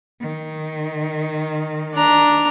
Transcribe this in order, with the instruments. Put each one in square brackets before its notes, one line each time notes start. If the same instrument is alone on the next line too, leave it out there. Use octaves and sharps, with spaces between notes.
[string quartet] D#3
[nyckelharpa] D4 A#5